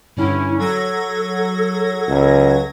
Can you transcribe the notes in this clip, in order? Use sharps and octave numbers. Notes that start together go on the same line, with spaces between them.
G2 D3 C#4 E4
F#3 A4 G#6 A#6
C#2